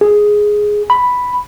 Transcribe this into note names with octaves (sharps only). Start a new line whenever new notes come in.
G#4
B5